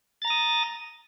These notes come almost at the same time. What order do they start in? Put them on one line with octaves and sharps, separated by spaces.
A6 A#5 A#6 D#6